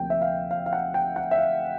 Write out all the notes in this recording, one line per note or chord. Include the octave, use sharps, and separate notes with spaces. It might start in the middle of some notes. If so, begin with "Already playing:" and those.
Already playing: D2 C3 F3 A#3 G5
E5
F5
F5
F5
F#5
G5
F#5
E5
F5